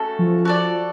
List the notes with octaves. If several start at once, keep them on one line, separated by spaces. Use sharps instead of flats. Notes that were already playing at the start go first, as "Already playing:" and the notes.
Already playing: A3 C#4 F#4 A4
F3
F#4 A4 D5